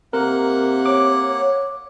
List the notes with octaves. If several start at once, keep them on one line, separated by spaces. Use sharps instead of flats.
C3 A#3 A#4 F#5 F#6
C#5 D6